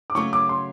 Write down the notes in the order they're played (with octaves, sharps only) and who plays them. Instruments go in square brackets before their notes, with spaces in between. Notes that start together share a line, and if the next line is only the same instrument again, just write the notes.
[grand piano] D6
[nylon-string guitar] C#3 F#3 A3 [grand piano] C#6
[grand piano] D6
C6